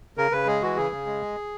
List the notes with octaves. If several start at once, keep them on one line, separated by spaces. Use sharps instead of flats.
C#3 A#4
C#3 B4
G#3 G#4
E3 F#4
C#3 G#4
C#3
G#3